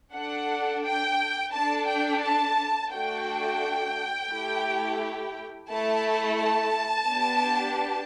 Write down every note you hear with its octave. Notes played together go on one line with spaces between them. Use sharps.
D4 A4 F#5
G5
D4 A4 A5
G5
A5
A3 D4 F#4 A4 G5
A3 E4 G4
A3 E4 A4 A5
A5
B3 D4 G4